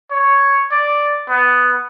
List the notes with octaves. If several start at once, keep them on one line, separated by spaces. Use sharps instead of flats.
C#5
D5
B3